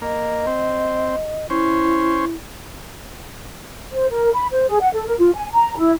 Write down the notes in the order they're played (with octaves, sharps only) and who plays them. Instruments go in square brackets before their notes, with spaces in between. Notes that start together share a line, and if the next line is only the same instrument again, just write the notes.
[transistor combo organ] A#3 [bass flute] D#5
[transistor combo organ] C4
[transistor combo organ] C#4 C5 [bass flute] E4
[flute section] C5
A#4
B5
C5
G#4
F#5
A4
A#4
F4
G#5
A#5
E4